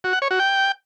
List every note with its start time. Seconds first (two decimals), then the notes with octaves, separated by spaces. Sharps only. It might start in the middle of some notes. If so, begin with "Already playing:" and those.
0.04 F#4
0.13 F#5
0.22 C#5
0.31 F#4
0.39 G5